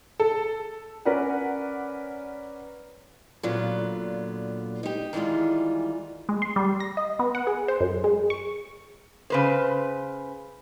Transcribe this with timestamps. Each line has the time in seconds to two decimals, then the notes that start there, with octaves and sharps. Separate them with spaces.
0.20 A4
1.05 C#4 A#4 B4 D5 F#5
3.43 A#2 D3 F#3 B3 F4
4.83 D#4 G4
5.13 D#3 E3 G3 G#3 F4
6.29 G#3
6.42 C6
6.56 G3
6.80 A#6
6.97 D#5
7.19 B3
7.35 F#5
7.47 G#4
7.68 C5
7.81 F#2
8.04 G#3
8.30 C#6
9.30 C#3 B4 C5